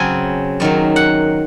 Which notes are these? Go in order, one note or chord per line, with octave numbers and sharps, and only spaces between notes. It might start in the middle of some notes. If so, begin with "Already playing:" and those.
Already playing: C#3 F#3 C4 G#5
F#2 D#3 F#3
F#5